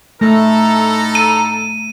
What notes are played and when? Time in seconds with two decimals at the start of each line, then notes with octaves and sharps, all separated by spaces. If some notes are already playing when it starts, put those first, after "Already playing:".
0.21 A2 A3 D#4 A4 A#5
1.15 D#7